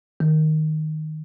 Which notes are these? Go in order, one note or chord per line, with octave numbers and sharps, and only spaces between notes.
D#3